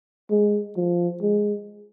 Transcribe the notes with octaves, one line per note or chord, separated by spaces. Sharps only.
G#3
F3
G#3